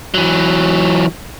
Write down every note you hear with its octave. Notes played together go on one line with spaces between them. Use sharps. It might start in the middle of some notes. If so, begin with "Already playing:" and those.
E3 F#3